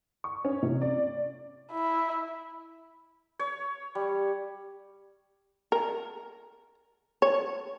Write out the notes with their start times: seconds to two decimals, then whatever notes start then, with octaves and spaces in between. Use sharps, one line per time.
0.24 C#6
0.45 C#4
0.63 C3
0.82 D5
1.72 E4
3.39 C#5
3.95 G3
5.72 A#4
7.22 C#5